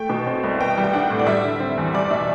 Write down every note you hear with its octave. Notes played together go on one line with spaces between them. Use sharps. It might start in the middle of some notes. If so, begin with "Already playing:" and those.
Already playing: A3 G5
B2
C4
C2
B3 G5
G3
G5
D4 F#5
A2
D5
G3 E5
D3
C4
E2
G3 D5
B2 E5